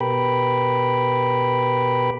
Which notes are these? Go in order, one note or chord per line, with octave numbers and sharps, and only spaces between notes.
B2 G4 A#4 B4 G5 B5